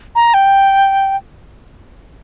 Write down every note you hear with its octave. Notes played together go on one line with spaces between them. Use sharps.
A#5
G5